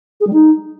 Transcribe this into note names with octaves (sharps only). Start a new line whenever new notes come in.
G#4
G3
D#4